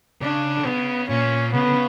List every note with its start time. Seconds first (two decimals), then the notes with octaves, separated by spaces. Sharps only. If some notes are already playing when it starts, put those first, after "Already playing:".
0.22 C#3 D4
0.58 D3
0.65 C#3 B3
1.09 A#2 C#4
1.53 C#3 B3
1.63 D3
1.72 C#3